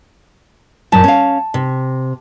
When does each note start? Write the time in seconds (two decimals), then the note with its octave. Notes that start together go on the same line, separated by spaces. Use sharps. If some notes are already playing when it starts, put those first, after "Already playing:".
0.92 F#2 A#2 A5
1.04 C#4 F5
1.54 C3